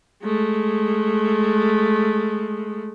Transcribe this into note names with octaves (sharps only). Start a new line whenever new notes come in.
G#3 A3